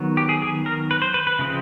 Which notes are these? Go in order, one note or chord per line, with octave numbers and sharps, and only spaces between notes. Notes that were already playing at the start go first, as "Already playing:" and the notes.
Already playing: D#3 F#3 B3
G4
G#4
G#4
A#4
B4
C5
B4
B4
C#3 F3 G#3 C4